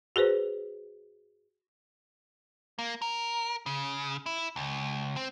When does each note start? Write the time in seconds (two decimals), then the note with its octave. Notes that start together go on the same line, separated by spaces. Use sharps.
0.16 F#4 G#4 B4 C5
2.79 A#3
3.02 A#4
3.66 C#3
4.26 E4
4.56 C#2
5.16 C4